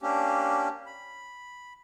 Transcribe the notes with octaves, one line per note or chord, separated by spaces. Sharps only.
A#3 C#4 D4 G4
B5